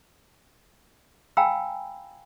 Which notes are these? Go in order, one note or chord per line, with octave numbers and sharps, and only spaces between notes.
F5 G5 G#5 A#5 B5 E6